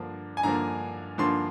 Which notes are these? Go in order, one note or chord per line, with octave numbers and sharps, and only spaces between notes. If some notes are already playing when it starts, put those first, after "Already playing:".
Already playing: G2 D3 F3 A#3
G#5
G2 D3 F3 A#3 A#5
G2 D3 F3 A#3 C6